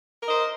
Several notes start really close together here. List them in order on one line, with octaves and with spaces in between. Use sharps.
A#4 D#5 C5